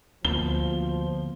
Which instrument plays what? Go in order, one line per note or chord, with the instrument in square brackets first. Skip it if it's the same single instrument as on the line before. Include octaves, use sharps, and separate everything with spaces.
[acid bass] D2 [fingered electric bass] D3 A#3 B3 [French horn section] F3 [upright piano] G7